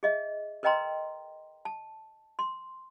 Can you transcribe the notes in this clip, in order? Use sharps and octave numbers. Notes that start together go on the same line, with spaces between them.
G#4 D#5 E5
A#4 B4 D#5 G5 A#5 C6
A5
C6